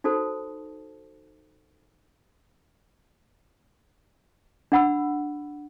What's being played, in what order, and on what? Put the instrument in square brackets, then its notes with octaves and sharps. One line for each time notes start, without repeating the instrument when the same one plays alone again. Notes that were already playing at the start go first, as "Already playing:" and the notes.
[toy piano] D#4 F#4 A4 C5 A5
D4 F#5 B5 E6